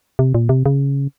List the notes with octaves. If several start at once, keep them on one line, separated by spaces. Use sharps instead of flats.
C3
A#2
C3
C#3